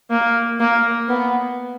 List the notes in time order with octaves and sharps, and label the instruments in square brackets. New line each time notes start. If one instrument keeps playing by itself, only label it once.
[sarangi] A#3
A#3
B3